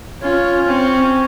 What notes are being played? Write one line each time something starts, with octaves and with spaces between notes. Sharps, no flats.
C#4 F4
C4 C#4